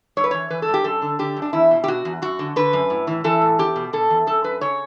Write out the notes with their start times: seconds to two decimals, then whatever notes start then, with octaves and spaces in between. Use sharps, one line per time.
0.17 G2 C#5
0.24 B4
0.31 E3 C#5
0.50 E3 B4
0.62 A4
0.68 G2
0.74 G4
0.84 F#2 A4
1.02 D3
1.19 D3 G4
1.37 F#2
1.42 D4
1.53 E2 E4
1.71 B2
1.84 G4
1.88 B2 F#4
2.05 E2
2.22 F#2 F#4
2.39 D3
2.56 D3 B4
2.73 F#2
2.90 A2
3.07 E3
3.24 E3 A4
3.42 A2
3.59 E2 G4
3.76 B2
3.93 B2 A4
4.10 E2
4.27 F#2 A4
4.44 F#2 B4
4.61 C#3 C#5